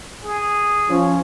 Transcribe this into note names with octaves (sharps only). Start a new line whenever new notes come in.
G#4
F3 C#4